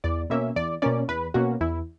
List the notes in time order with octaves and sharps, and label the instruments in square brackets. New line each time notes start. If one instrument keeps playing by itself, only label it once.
[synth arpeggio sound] E2 D5
B2 A#3 C#4 E5
E2 D5
B2 A#3 C#4 D5
E2 B4
B2 A#3 C#4 F#4
E2 E4